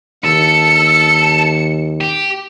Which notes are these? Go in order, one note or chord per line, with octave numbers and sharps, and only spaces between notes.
D#2 A4 C#7
G4